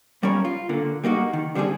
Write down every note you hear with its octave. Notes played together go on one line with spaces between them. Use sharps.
B1 G3 C#4 A#4 C#5
F4
A#2 D3 A#3
G3 A#3 D#4 F#4
D#3
D3 G3 C4 D4 G#4